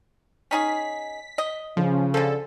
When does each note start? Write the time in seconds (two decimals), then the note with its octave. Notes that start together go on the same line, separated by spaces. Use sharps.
0.51 C#4 D#4 G#4 B6
1.38 D#5
1.77 C#3 F3
2.14 D3 F3 A4